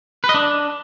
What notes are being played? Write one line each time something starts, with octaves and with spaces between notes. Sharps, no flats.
B4
D#5
D4